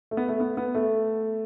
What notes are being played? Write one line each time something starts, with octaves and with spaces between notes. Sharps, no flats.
A3
B3
A3
B3
B3
A3